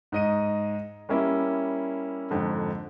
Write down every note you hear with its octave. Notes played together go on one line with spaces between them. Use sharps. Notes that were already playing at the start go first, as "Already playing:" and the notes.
G#2 D#5 D#7
G3 A#3 C#4 E4
F2 G#2 D3